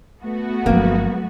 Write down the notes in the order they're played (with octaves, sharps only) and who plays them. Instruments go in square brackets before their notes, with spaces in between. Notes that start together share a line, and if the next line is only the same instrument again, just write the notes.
[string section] A3 B3 F#4
[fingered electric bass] G1 F3 C#4 [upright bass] F#3 G#3 [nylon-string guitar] A#3